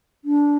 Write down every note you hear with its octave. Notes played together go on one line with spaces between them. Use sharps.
D4